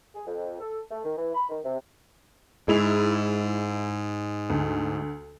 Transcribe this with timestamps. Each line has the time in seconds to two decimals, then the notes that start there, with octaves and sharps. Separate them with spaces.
0.15 G#4
0.27 F2
0.60 A4
0.91 A3
1.04 D#3
1.17 E3
1.35 B5
1.49 D#3
1.65 C3
2.68 G#2 G#3 E4 F7
4.50 D2